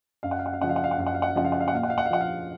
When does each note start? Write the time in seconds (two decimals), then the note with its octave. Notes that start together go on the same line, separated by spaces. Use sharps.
0.23 F#2 F5
0.31 F#5
0.39 F5
0.46 F#5
0.53 F5
0.61 C#3 F3 F#5
0.69 F5
0.76 F#5
0.84 F5
0.91 F#5
0.98 F#2 F5
1.07 F#5
1.14 F5
1.22 F#5
1.30 F5
1.35 C#3 F3 F#5
1.45 F5
1.52 F#5
1.60 F5
1.68 F#5
1.73 A#2 F5
1.83 F#5
1.90 F5
1.98 F#5
2.06 F5
2.11 F3 F#5
2.21 F5